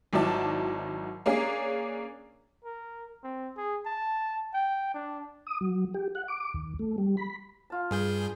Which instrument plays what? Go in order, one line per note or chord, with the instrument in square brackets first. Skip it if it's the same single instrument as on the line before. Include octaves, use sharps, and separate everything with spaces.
[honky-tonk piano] G#1 D#3 F#3 E4 D5 A5
A#3 C#4 D4 G#4
[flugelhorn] A#4
C4
G#4
A5
G5
D4
[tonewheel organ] D#6
F#3
G4
F#5
D6
D#2
A3
G3
B5
[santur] F4 A5
[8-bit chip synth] G2 G#4 G6